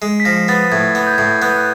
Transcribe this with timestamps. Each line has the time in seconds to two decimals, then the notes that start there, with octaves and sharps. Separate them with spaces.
0.02 G#3
0.20 B6
0.25 F3 A#6
0.48 B3 A6
0.72 A2 G#6
0.95 B3
1.07 G6
1.14 G#6
1.18 A2 G6
1.42 B3 F#6
1.50 G6
1.58 F#6